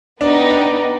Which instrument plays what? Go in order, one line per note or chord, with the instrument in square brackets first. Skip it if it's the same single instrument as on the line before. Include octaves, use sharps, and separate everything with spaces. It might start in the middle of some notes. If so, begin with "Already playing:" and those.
[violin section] B3 D#4 G4 [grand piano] D4
[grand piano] D4